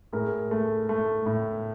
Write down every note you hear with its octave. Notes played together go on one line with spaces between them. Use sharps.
A2 G#4 A#4
A3
A3
A2